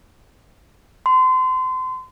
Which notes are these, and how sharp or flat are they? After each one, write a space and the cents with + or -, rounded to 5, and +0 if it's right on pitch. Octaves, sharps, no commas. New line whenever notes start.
C6 -30